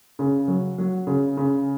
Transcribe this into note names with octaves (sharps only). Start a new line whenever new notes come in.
C#3
F#3
F#3
C#3
C#3